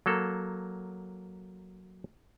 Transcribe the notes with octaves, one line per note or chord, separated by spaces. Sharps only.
F#3 A#3 A4